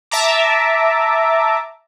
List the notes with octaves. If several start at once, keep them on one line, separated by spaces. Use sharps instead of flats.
E5 A5 A#5 D6